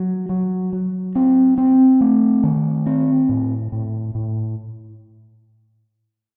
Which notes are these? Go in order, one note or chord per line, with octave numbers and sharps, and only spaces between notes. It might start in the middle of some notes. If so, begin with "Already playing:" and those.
Already playing: F#3
F#3
F#3
C4
C4
A3
D#3
C4
A2
A2
A2